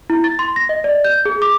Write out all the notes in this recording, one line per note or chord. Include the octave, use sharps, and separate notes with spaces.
E4
A6
C6
A#6
D#5
D5
G6
G#4
D6